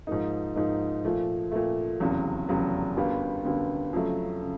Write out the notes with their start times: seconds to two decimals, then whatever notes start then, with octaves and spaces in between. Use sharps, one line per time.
0.07 G#2 F3 A#3 D#4
0.56 G#2 F3 A#3 D#4
1.05 A#2 F3 A3
1.52 A#2 F3 A3
2.00 F1 E2 C#3 F#3
2.49 F1 E2 C#3 F#3
2.97 G1 F#2 D3 G3 B3
3.45 G1 F#2 D3 G3 B3
3.93 F2 C#3 F#3 A3
4.42 C#3